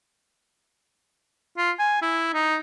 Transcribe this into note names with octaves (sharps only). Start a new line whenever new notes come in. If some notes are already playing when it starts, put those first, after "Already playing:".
F4
G#5
E4
D#4